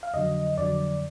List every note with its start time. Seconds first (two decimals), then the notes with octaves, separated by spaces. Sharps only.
0.03 F5
0.14 F2 D3 F#3 D#5
0.58 F2 D3 F#3 D5